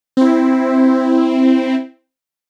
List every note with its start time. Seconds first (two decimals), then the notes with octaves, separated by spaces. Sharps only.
0.17 C4 E4